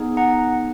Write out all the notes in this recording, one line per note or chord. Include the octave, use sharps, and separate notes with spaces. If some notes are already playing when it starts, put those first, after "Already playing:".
Already playing: B3 D#4 G#4
F#5 A#5